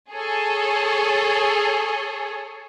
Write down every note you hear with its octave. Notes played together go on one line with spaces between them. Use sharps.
G#4 A4 C#5